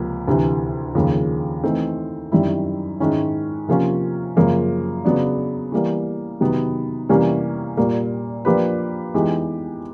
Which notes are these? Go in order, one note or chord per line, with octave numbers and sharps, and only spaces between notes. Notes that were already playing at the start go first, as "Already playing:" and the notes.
Already playing: C#2 C3 F3 A#3
D2 C3 E3
D#2 C#3 F3 A#3
E3 A3 C4 D#4
F#2 D#3 G3 C4 E4
G#2 D#3 G#3 C#4 E4
C3 F3 A#3 C#4 F4
F#2 C#3 F3 A#3
C#3 F#3 B3 D4
E3 G3 A#3
C3 D#3 F#3 B3
C3 E3 G3 A#3 C#4
A#2 G3 A#3
F3 A#3 D4 G4 B4
E3 G#3 B3 D#4 G4